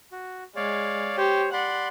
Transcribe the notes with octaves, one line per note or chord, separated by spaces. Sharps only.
F#4
G#3 C#5 D5 F5
G4 C5 C#5
D5 F#5 B5 C6